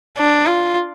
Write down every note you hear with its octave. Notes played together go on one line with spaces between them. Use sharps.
D4
F4